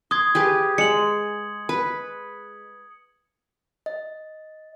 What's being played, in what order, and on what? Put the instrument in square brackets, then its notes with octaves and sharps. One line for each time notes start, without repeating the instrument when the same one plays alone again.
[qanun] C6 [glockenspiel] D#6 G#6
[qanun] G4 G#4 B4
[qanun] G#3 [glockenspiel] C#7 F#7
[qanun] B4
[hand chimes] D#5